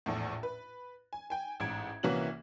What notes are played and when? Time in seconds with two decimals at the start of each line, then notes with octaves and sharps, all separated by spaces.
0.06 A#1 E2 A2
0.43 B4
1.13 G#5
1.30 G5 G#5
1.60 A1 G#2 G#6 D7
2.03 C2 E3 A#3 C#4 F#4 F#7